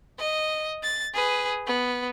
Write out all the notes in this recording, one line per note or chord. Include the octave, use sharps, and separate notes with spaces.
D#5
A6
G#4 B4
B3